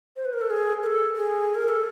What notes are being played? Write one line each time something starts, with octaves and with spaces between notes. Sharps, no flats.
C5
B4
A#4
A4
G#4
A#4
A4
G#4
A#4
A4